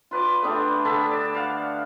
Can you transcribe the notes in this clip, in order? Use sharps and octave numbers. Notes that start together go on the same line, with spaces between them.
F4 B4 D5 D6
A3 B3 D4 G4
D3 E5 A5 B5
D5
F5 F#5